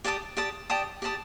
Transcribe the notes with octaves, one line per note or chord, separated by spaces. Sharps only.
G4 D5 A5 D#6
G4 D5 A5 D#6
G4 D5 A5 D#6
G4 D5 A5 D#6